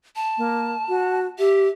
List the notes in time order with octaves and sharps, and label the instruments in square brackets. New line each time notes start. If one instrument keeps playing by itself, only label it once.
[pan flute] A5
[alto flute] A#3
F#4
[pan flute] G4 [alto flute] E5